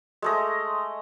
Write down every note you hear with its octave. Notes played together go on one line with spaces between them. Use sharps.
G#3 A3 D#5